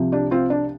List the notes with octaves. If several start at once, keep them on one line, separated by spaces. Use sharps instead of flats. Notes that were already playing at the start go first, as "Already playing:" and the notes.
Already playing: C2 C3 F3
D4 G4
C4 F4
D4